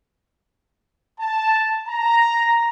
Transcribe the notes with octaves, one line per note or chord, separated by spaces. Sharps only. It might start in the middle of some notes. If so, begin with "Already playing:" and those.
A5
A#5